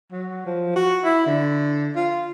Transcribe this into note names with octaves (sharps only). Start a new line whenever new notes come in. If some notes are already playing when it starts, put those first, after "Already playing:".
F#3
F3
F#4
E4
D3
F4